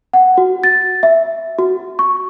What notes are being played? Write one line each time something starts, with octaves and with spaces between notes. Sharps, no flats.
F#5
F#4
A6
E5
F#4
C#6